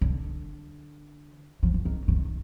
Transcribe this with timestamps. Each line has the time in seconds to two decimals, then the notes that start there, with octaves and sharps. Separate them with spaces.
0.01 D3
1.63 F3
1.74 E3
1.85 D#3
2.08 D#3